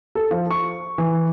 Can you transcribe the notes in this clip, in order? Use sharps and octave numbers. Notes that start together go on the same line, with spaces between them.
A4
F3
C#6
E3